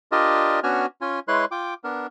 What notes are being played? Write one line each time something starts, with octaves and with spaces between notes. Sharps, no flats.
D4 F4 G4 A#4 D5 D#5
B3 C#4 D4 F#4 G#5 F6
C#4 F4 G#5
G#3 E4 B4 C#5 C6 F#6
F4 G5 D6
B3 D4 A#4